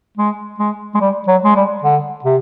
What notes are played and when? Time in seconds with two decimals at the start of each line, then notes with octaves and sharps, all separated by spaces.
0.18 G#3
0.58 G#3
0.95 G#3
1.01 G3
1.27 F#3
1.44 G#3
1.55 G3
1.84 D3
2.24 C3